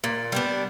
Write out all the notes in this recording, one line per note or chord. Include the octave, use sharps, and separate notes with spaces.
A#2
G3 B3 D4